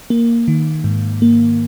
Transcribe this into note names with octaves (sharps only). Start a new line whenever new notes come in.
A#3
D#3
G#2
A#3